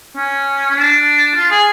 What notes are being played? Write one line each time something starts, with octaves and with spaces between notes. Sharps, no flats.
C#4
C#4
D4
F4
G#4